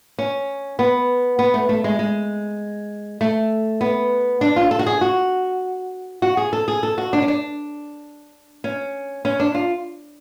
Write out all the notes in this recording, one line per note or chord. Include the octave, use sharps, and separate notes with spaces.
C#4
B3
B3
A3
A3
G#3
G#3
A3
B3
D4
F4
A4
F#4
G#4
F#4
F#4
G#4
A4
G#4
A4
F#4
D4
C#4
D4
C#4
C#4
D4
F4